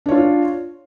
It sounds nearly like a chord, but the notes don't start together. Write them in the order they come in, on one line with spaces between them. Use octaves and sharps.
D4 C#5 F4